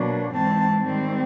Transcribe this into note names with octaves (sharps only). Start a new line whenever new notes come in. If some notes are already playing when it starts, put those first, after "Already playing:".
Already playing: B2 F#3 A#3 D4
G#2 E3 G#3 C4 A5
G#2 D#3 G3 C4